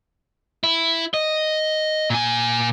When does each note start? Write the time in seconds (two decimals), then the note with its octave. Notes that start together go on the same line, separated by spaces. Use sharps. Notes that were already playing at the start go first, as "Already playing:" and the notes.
0.64 E4
1.14 D#5
2.10 A#2 G#5